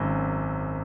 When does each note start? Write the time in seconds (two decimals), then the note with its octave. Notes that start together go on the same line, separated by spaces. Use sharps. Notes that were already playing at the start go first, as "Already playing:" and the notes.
Already playing: G#1 F#2